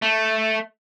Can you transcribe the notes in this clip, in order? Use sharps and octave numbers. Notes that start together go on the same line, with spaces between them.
A3